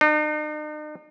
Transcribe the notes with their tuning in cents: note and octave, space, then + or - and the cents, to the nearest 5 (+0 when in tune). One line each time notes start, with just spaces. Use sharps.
D#4 -45